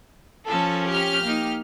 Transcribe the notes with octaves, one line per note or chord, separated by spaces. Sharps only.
F3 C#4 A4
G4 F6
A#3 D#4